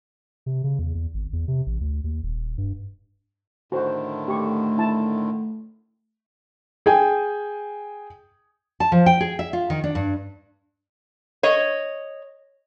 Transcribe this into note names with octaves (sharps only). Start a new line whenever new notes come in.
C3
C#3
E2
E2
G#1
E2
C3
A1
D2
D#2
D#1
G2
A2 D3 D#3 F#4 C5
A3 G4 C#6
E4 A5
G#4 G5 G#5
A5
F3
G5
G#4
E5
F4
D#3
D4
G2
C#5 D#5